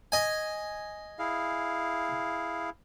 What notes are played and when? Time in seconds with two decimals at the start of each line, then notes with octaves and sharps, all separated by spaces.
0.12 D#5 G#5
1.19 E4 G#4 F5